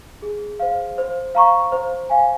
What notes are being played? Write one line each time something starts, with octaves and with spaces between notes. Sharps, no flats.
G#4
C5 F5
C5
F5 A#5 C#6
C5
F5 G#5